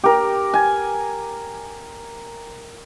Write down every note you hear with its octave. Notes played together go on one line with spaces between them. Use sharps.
G4 A#4
G#5